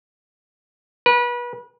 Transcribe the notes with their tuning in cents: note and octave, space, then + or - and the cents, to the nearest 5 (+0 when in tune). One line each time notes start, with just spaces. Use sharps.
B4 -30